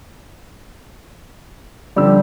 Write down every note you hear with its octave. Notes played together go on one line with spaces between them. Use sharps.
D3 F3 G3 E6